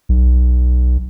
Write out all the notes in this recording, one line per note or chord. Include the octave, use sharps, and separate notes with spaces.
B1